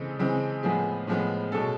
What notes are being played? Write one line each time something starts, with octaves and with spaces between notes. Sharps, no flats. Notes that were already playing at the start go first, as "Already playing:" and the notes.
Already playing: C#3 E3 G#3 C4 A4
C#3 E3 G#3 C4
A2 F3 G#3 B3 G#4
A2 F3 G#3 B3
B2 G#3 C#4 A4